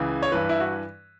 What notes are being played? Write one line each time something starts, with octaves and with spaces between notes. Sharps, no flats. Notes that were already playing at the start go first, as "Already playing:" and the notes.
Already playing: C#2 C#3 E3
C#5
G2 E3 B4
E4
F#4